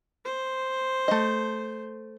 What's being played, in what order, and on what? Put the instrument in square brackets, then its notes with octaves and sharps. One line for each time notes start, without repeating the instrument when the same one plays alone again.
[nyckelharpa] C5
[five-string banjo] A3 D#5